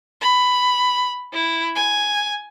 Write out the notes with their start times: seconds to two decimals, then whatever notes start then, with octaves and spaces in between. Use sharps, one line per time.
0.21 B5
1.33 E4
1.75 G#5